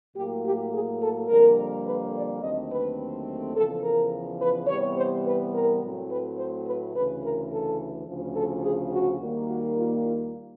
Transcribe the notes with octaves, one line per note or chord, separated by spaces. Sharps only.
A2 F#3 A#3 G4
G4
G#4
A4
F2 D3 G3 A#3 A#4
B4
D5
D#2 D3 F#3 A3 C4 D#5
B4
E2 C#3 F3 A4
A#4
B4
C3 E3 G3 B3 C#5
C5
B4
A#4
A2 F#3 A3 C4
B4
C5
B4
D2 C#3 E3 B4
A#4
A4
D2 C#3 F3
A4
G#4
F#4
D#2 D#3 G3 A#3
F#4
F4
F4